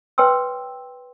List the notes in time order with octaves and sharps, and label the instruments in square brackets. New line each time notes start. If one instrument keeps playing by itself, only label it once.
[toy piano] B4 C#5 G5 C6 E6